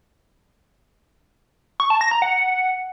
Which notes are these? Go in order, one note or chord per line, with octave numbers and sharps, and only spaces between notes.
C#6
A5
A#6
A#5
F#5